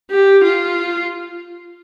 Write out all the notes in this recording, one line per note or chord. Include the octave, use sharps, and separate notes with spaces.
G4
F4